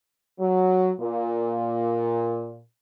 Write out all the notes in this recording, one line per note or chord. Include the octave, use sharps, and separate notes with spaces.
F#3
A#2